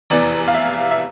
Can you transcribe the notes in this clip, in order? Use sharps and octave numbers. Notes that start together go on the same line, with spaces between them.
F1 E2 E3 D5
F5
E5
E5